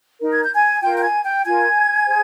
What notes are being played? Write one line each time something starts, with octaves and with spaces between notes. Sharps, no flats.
D#4 A#4
G#6
G6
G#5 G#6
F4 A#4 G5 G6
G6
G#5 G#6
G5 G6
F4 A#4 G#5 G#6
G#4 C5